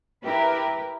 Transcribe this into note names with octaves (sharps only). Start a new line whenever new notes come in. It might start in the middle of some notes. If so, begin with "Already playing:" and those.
E4 G4 A#4 B4